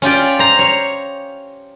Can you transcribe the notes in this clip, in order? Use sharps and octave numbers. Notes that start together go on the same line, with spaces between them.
C#4 F4 G4 D5
C5 A#5
C#5